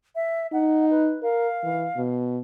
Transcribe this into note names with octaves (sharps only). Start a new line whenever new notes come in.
E5
D#4 F#5
B4
A#4 F5
E3
B2